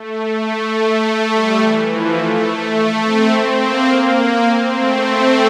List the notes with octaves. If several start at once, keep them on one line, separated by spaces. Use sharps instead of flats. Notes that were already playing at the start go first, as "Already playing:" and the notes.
Already playing: A3
A3
A3
G3
E3
F3
A3
A3
A3
C4
A#3
A#3
C4
A3